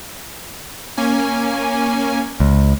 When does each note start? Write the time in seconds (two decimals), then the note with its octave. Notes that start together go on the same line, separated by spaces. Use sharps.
0.97 A#3 C#4 G#5
2.40 C#2